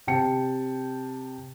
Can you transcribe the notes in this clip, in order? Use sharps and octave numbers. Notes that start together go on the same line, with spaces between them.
C3 G5 A5 C#7